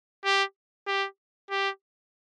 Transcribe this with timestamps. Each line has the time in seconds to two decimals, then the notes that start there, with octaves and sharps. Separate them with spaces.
0.25 G4
0.87 G4
1.50 G4